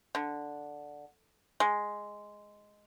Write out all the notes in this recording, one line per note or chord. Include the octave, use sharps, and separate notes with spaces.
D3
G#3